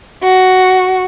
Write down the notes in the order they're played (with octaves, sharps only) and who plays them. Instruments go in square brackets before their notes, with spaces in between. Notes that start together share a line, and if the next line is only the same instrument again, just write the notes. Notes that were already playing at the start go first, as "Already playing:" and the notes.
[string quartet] F#4